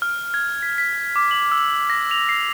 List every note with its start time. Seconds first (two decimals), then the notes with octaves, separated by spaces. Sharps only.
0.02 F6
0.34 G#6
0.62 B6
0.78 B6
1.16 D6
1.31 F#7
1.52 E6
1.90 A#6
2.11 F7
2.29 C7